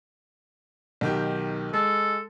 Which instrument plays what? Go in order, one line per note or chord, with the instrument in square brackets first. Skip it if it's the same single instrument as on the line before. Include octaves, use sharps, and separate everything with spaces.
[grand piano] B1 D#3 G4
[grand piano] G#3 [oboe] A4